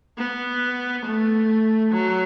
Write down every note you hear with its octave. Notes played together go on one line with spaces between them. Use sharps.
B3
A3
F#3